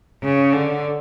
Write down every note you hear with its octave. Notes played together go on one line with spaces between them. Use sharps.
C#3
D3